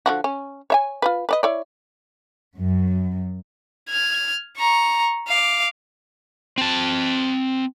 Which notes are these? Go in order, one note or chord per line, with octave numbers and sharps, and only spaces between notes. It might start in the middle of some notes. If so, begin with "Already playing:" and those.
D3 F3 F#4
C#4
C#5 E5 G#5
F4 G4 B4
B4 D5 D#5
E4 C#5 D5
F#2
F6 G#6
A#5 C#6
F5 D6
C4 A5